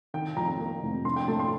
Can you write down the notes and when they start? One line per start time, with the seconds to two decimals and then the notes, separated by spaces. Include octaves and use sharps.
0.14 D#3 G5
0.37 F2 A#5
0.59 A#3
0.83 F1
1.05 D4 C6
1.16 G5
1.28 A3 A5
1.40 C6